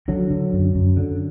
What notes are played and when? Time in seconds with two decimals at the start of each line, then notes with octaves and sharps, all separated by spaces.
0.08 D3 F#3
0.30 D3
0.53 F#2
0.75 F#2
0.97 D3